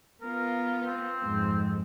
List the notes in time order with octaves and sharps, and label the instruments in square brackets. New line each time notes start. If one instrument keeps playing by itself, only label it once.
[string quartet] B3 F4 [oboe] A#4
[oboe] C4
[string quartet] F2 G#2